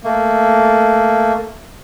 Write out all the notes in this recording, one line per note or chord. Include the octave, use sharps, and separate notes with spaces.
A3 A#3